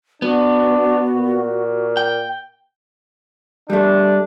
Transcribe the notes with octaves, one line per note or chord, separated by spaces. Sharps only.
B3 D4 F#4
A#2
G5
G3 A3 D4